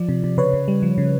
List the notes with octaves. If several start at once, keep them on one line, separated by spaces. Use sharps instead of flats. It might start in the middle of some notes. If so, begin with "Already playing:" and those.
Already playing: F3 D5
C3
C3
C#3 B4 C#5
C#3
G3
F3
C#3